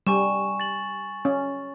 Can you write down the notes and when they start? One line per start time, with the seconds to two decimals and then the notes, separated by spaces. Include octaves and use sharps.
0.07 G3 G#5 C#6 E7
0.60 A6 F#7
1.25 C#4